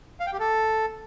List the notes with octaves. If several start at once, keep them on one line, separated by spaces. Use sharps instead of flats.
F5
G5
G4
A4